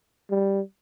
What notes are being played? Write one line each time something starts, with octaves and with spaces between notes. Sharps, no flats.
G3